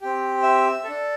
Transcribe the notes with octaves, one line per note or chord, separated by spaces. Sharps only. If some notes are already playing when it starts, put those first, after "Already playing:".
C4 G4
E5
D4 A4